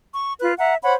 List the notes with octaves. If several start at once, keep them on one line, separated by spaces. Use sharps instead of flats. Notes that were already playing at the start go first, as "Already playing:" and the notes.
C#6
F4 B4 F#6
E5 F#5 A#5
C5 C#5 F#5 B5